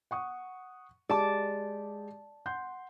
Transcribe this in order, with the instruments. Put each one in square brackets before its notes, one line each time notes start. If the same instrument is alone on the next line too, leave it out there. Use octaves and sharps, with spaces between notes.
[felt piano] F#5 C#6 D#6
[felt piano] G#3 G4 [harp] D5 A5 D6
[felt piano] F#5 C6 G6